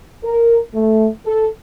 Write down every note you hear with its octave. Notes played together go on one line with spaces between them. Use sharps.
A#4
A3
A4